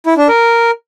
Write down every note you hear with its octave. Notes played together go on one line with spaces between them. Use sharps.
E4
D4
A#4